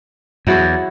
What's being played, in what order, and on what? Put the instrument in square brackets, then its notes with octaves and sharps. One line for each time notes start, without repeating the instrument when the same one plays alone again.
[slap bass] E2 [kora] F#3 E4 F#4